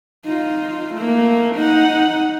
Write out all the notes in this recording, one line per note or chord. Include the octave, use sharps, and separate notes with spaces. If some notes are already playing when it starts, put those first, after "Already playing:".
D#4 F4
A3 A#3
D#4 F#5